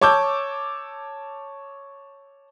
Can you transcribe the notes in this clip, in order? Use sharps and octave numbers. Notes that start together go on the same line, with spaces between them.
C#5 A5 D6 E6 G6